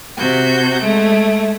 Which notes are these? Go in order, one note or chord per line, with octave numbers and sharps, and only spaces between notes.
C3 F#4 G6
G#3 A3